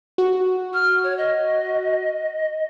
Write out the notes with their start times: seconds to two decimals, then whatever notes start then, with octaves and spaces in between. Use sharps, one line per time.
0.18 F#4
0.73 F6
1.03 C#5
1.17 D#5